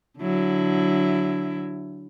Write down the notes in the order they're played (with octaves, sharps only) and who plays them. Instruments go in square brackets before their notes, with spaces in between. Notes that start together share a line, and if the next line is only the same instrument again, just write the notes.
[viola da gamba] D3 F#3 E4